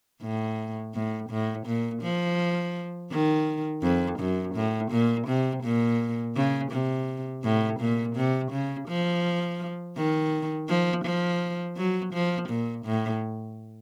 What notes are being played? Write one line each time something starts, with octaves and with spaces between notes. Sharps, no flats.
A2
A2
A2
A#2
F3
D#3
F2
F#2
A2
A#2
C3
A#2
C#3
C3
A2
A#2
C3
C#3
F3
D#3
F3
F3
F#3
F3
A#2
A2